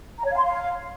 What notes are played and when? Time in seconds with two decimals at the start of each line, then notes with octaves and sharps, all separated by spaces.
0.17 A#5
0.24 C#5
0.30 F5
0.37 C6
0.43 F5